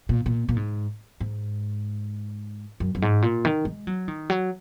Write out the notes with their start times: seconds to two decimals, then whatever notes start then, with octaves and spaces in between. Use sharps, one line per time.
0.09 A#2
0.26 A#2
0.49 A#2
0.56 G#2
1.21 G#2
2.80 F#2
2.95 F#2
3.02 G#2
3.22 A#2
3.45 D#3
3.65 G#3
3.87 F#3
4.08 D#3
4.30 F#3